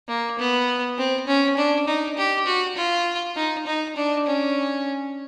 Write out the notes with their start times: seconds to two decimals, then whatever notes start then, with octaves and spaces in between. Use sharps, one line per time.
0.08 A#3
0.39 B3
0.98 C4
1.27 C#4
1.57 D4
1.87 D#4
2.17 G4
2.46 F#4
2.76 F4
3.36 D#4
3.67 D#4
3.96 D4
4.26 C#4